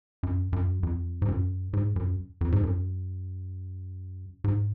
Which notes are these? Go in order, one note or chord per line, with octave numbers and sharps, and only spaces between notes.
F#2
F#2
F2
G#2
F#2
G#2
F#2
F2
G#2
F#2
G#2